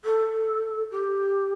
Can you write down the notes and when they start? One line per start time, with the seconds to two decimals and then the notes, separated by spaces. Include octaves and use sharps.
0.04 A4
0.91 G4